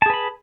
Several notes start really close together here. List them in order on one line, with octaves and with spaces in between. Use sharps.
A5 G#4 B4 B5